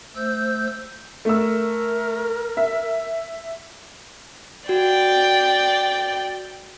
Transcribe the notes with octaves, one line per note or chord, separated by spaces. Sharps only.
A3 C5 E6 G6
A3 A#4 E6
E5
F#4 D5 G5